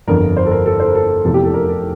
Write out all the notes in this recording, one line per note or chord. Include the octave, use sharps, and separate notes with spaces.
G1 F2 D3 F3 A#4
C5
A4
A#4
A4
C5
A#4
A4
F1 E2 C3 F3 A4
G4
A4
A#4
A4